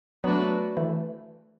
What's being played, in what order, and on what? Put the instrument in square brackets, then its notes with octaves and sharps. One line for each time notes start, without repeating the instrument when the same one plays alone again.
[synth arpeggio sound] F#3 B3 [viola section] A3 D4 F#4 B4
[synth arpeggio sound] E3 A3